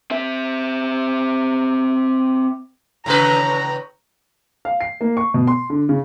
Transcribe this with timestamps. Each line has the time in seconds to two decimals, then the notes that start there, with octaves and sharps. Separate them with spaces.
0.11 C4 E5
3.06 A2 C#3 B4 A#5
4.65 F5
4.81 C7
5.01 A#3
5.17 C#6
5.34 B2
5.47 C6
5.70 D3
5.89 C#3